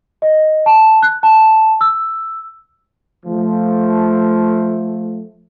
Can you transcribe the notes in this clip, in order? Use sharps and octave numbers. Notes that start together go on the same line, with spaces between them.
D#5
A5
F#6
A5
E6
F3 A3